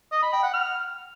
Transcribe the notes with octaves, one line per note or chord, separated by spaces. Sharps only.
D#5
B5
G5
F#5
F6